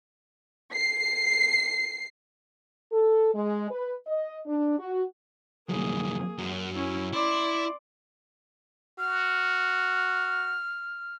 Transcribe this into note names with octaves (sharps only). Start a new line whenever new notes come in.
C7
A4
G#3
B4
D#5
D4
F#4
C2 F#2 A#3 G#4
F#2
C#4 E4
E4 D5 C6
F#4 F6